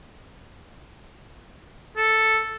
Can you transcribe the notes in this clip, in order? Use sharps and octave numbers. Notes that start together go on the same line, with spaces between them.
A4